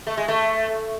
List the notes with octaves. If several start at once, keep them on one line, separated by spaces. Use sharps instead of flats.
A3
G#3
A3